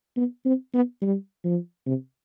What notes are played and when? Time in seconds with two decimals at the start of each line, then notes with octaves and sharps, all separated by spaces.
0.17 B3
0.46 C4
0.74 B3
1.02 G3
1.44 F3
1.86 C3